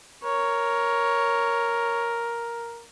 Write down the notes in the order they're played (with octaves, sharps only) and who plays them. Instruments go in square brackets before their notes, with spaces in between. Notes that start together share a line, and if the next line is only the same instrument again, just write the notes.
[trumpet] A#4 [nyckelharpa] C#5